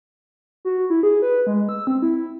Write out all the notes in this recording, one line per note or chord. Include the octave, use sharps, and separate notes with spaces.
F#4
F#4
E4
G#4
B4
G#3
E6
C4
E4